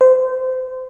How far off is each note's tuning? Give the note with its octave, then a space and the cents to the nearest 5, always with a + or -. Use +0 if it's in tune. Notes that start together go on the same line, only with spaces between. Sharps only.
C5 -25